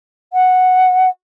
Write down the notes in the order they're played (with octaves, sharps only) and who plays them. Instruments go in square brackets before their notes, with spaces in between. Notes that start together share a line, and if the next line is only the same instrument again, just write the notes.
[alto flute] F#5